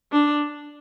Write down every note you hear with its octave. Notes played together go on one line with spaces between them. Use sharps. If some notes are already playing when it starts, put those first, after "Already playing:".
D4